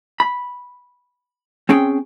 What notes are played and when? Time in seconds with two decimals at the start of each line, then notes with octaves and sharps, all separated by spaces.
0.20 B5
1.69 C4 C#4 G#4 G5